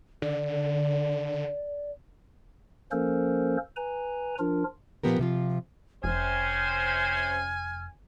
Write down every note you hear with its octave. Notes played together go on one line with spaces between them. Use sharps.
D3 D5
F3 A#3 C#4 A4 A#4 C5
B4 G#5 A#5
F3 D4 F4 A#4
A#2 E3 F3 B3 G4 A#4
C3 F3 F4
F1 C3 C#4 C5 G#5 F6